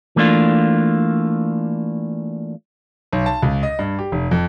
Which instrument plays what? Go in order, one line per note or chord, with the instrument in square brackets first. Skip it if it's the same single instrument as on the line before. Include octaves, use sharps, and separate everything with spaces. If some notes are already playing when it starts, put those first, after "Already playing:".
[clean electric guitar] E3 A3 A#3 D4 F4
[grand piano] B1
A5
C#2
D#5
G2
G4
F1
F2